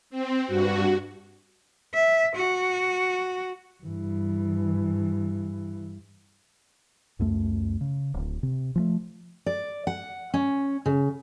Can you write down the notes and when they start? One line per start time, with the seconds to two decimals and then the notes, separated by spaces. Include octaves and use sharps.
0.10 C4
0.47 G2 F#4
1.94 E5
2.36 F#4
3.83 G2 E3
7.19 C#2 F#2 A3
7.81 C#3
8.14 D1
8.43 C3
8.75 F3 G3 A3
9.46 D5
9.87 F#5
10.34 C#4
10.86 C#3